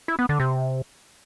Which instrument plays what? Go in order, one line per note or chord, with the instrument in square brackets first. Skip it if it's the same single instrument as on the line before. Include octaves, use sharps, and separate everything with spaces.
[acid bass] E4
B3
D3
C3